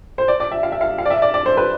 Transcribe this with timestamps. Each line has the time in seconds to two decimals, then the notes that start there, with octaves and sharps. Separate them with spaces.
0.18 C5
0.28 D5
0.40 D5
0.51 E5
0.63 F5
0.72 E5
0.81 F5
0.98 F5
1.05 D5
1.10 E5
1.22 D5
1.34 D5
1.46 C5
1.57 B4